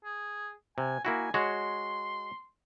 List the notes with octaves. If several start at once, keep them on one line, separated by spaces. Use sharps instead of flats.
G#4
C3 G#5
A#3 E4 F#4 G#5
G#3 F#4 C#5 C6